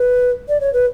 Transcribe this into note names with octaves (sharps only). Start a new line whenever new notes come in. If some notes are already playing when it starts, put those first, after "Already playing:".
Already playing: B4
D5
C#5
B4